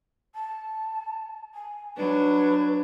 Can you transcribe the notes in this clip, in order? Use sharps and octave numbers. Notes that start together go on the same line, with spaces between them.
A5
G#5
F#3 D4 B4